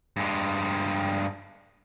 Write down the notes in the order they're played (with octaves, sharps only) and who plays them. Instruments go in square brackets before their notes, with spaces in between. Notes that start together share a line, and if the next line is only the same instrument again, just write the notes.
[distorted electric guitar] G2 G#3